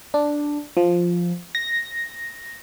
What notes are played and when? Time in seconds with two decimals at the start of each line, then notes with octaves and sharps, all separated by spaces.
0.14 D4
0.77 F3
1.55 A#6